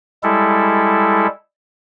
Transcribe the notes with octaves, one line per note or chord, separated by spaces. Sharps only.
G3 G#3 E4 A4